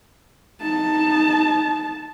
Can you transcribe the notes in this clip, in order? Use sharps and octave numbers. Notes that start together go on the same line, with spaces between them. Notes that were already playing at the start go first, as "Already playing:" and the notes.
D#4 A5